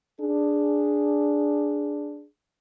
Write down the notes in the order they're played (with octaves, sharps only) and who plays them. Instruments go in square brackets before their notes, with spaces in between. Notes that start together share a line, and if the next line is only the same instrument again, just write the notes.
[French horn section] D4 G#4